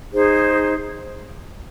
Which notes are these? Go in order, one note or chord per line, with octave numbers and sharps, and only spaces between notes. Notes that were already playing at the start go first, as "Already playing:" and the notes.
D#4 G#4 C5